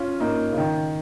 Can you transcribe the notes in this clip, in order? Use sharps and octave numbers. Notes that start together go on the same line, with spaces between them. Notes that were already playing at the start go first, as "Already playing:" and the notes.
Already playing: C#4 F4
A#3 D#4
C#3
D#3